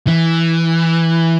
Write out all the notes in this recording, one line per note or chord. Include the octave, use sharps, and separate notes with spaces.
E3